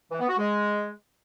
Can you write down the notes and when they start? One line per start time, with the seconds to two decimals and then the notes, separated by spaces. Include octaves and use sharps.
0.11 E3
0.20 B3
0.29 F#4
0.37 G#3